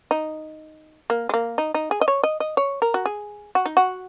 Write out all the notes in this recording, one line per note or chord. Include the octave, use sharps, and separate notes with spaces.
D#4
A#3
G#3
A#3
D#4
D#4
G#4
D#5
C#5
D#5
D#5
C#5
A#4
F#4
G#4
F#4
D#4
F#4